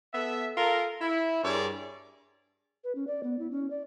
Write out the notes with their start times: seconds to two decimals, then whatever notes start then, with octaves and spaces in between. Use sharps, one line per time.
0.14 B3 A4 E5
0.58 F4 A4 A#4
1.02 E4
1.44 G2 G#4 A#4 C#5 D5
2.84 B4
2.95 C#4
3.07 D5
3.23 B3
3.39 E4
3.51 C#4
3.70 D5